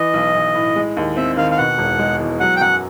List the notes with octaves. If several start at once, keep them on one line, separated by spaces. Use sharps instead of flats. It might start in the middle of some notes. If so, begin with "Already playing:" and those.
Already playing: E3 D#5
B1
B1
A2
G#3
D#2
C4 E5
D#3 F5
F5
B2 F#5
E1
G#3
E2
F#3 F#5
G5
F#2 F#5